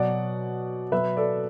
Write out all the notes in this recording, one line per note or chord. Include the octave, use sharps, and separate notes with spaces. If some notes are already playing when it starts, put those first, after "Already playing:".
Already playing: B2 F#3 D5 F#5
B2 F#3 B4 E5
A4 D5